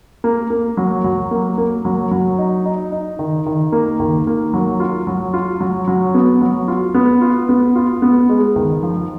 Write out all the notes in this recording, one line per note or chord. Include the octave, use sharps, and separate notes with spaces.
A#3
A#3
F#3
F#3
A#3
A#3
F#3
F#3
D#4
D#4
D#4
D#3
D#3
A#3
D#3
A#3
F#3
F4
F#3
F4
F#3
F#3
B3
F#3
F4
B3
F4
B3
F4
B3
G#3
D#3
F3